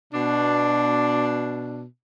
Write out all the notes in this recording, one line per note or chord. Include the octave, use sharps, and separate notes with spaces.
B2 D4